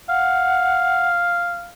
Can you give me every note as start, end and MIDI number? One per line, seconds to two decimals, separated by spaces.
0.09 1.71 77
0.09 1.08 78